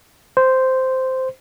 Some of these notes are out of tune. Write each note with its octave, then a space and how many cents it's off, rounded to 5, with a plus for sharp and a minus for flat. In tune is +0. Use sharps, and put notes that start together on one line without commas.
C5 -5